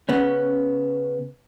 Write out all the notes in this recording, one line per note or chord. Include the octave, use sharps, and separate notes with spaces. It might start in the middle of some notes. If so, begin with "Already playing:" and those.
C#3 B3 C#4